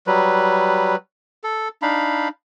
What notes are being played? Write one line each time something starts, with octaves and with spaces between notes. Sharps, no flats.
F#3 G3 B4
A4
D4 D#4 F5 B5